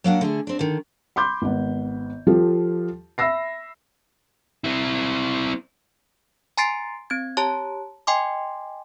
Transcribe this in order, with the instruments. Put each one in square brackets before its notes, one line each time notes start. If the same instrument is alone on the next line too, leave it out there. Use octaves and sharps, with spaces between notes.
[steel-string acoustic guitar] F#3 A#3 D4 F#5
D3 A3 G#4
C4 D4
D3 D#3
[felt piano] B5 C6 D6 G6
G#1 B3
F3 F4 G4 A4
E5 B5 E6 A#6 C7
[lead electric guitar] C4 E4
[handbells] G#5 A#5 C6 A6 C7 D7
C4 G#6
G4 C#5 A5 A#5
D#5 G5 G#5 C6 D6